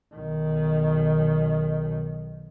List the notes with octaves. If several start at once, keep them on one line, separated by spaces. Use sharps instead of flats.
B1 D#3